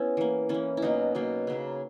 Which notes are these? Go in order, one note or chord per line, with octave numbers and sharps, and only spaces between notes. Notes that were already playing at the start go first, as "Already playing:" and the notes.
Already playing: B3 C#4 E4
E3 A#3
E3 A#3 C#4
E4
B2 F#3 A#3 D#4
B2 F#3 A#3
C#3 F#3 A#3